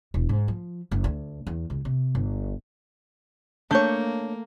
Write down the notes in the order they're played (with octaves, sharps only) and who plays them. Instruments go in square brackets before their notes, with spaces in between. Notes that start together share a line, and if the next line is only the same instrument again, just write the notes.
[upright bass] E1
G#2
F3
F#1
D2
E2
C#2
C3
G1
[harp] A3 G6 [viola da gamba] A#3 [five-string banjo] D4 C#5